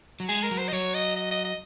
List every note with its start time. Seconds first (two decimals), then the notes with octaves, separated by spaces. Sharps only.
0.20 F#3
0.29 G#3 G#4
0.43 A#4
0.51 F#3
0.58 C5
0.68 D#5
0.73 F#3 C#5
0.94 D#5
1.16 D#5
1.31 D#5
1.45 D#5